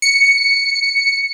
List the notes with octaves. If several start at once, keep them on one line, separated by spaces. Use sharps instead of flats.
C#7